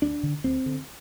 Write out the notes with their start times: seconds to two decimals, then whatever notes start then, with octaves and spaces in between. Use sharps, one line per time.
0.02 D2 D4
0.23 D3
0.44 D2 C4
0.66 D3